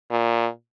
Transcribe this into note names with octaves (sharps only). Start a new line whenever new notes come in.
A#2